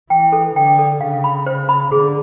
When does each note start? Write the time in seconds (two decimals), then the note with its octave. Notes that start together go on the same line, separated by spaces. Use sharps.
0.10 E3 G5
0.32 A4
0.55 D3 G5
0.79 A4
1.01 C#3 F5
1.24 B5
1.46 C5
1.69 B5
1.92 D3 G#4